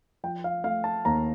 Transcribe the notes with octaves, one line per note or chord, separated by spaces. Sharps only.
F3 G5
F5
A3 F5
A5
D#2 A#5